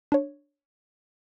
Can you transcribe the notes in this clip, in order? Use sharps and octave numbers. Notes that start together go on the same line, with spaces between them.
D4 C#5